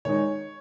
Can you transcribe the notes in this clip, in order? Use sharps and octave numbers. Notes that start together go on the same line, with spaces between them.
D#3 G#3 D#4 C#5